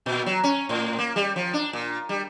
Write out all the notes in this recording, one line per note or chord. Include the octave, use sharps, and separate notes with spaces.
A#2
F#3
C#4
A2
A#3
G3
F3
D4
A#2
G3